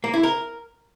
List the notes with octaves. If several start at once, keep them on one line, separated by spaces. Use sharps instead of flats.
A#3
E4
A#4